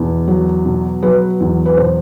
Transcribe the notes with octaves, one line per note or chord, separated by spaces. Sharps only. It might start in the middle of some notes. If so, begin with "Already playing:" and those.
Already playing: E2 B2
F#3
B2
F#3 B4
E2
B4
B2 C5